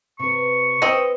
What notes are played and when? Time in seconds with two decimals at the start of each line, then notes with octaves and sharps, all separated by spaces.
0.19 C3 B4 C#6
0.82 C4 B4 D#5